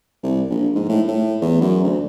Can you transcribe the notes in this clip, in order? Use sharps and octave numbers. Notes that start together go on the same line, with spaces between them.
C2
A#1
G#2
A2
A2
E2
F#2
D2